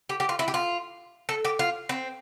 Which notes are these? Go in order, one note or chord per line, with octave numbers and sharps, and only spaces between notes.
G4
G4
F4
E4
G4
F4
A4
G4
F4
C4